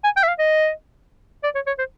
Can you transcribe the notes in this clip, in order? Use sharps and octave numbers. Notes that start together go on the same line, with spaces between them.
G#5
G5
E5
F5
D#5
D5
C#5
C#5
C5